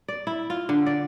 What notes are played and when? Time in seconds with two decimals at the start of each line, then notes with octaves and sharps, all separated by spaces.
0.08 D5
0.27 E4
0.50 F4
0.69 D3
0.86 D5